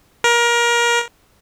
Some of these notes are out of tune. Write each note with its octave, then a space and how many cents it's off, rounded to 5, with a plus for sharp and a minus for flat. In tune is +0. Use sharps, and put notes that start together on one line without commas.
A#4 +25